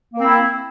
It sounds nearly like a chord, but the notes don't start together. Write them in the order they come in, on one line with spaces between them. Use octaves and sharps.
A#3 C4 E4